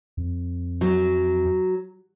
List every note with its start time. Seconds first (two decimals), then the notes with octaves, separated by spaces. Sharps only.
0.17 F2
0.81 F#3